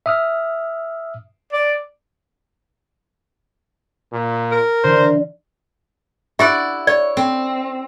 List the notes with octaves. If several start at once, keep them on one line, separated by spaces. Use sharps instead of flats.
E5 D#6 F6
D5
A#2
A#4
D3 E3 C5
E4 G4 D5 E5 F#5
C#5 D5
C4